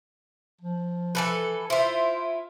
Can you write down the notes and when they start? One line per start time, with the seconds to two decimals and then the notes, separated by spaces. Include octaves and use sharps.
0.61 F3
1.15 E3 A4 B4
1.70 E4 F4 C5